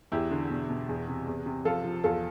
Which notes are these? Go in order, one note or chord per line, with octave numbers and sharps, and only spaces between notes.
E2 E4 G4
D3
B2
B2
E2
C3
E2
C3
F3 F4 A4
F3
E2 F4 A4